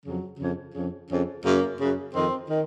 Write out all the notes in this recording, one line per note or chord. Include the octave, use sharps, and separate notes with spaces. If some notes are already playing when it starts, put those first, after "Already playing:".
F2 C#3 F#3
F2 C#3
F2 C#3
F2 C#3
F#2 C#3 A#3
F#2 C#3
F2 D#3 C4
D#3